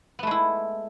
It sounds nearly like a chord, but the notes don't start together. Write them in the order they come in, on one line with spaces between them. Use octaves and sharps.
B3 A3 G#3 E4